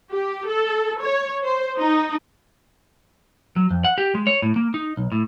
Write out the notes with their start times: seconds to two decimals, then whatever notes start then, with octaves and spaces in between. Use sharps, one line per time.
0.13 G4
0.48 A4
1.01 C#5
1.44 C5
1.78 D#4
3.56 F#3
3.70 F2
3.84 F#5
3.98 G4
4.15 G#3
4.27 C#5
4.42 A2
4.56 A#3
4.74 D#4
4.97 B1
5.12 A2